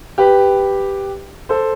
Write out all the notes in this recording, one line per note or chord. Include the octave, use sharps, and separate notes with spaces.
G4 B4
A4 C5